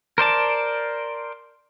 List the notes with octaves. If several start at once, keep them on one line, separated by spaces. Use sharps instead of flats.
A#4 C5 D5 A5